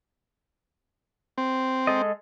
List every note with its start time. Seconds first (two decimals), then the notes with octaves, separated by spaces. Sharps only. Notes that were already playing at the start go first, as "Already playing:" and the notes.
1.38 C4
1.87 G#3 A4 D#5